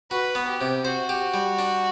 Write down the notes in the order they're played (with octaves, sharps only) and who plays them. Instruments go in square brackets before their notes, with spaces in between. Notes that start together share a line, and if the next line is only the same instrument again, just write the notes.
[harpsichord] F#4 [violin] B4
[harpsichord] B3
[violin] G4
[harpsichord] C3
[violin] F#4 [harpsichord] C5
[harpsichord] G4
G3
D4